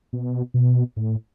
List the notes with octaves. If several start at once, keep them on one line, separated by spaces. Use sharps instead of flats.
B2
B2
A2